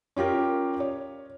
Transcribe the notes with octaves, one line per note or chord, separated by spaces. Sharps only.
C#4 F4 G4 A#4
C#5